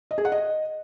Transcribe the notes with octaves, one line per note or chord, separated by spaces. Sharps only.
D#5
G#4
F#5
D#5